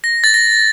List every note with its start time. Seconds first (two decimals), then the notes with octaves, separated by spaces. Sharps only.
0.04 A#6
0.24 A6
0.34 A#6